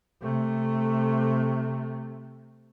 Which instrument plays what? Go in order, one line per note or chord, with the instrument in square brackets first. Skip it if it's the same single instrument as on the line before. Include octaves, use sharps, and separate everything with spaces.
[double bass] C3 A3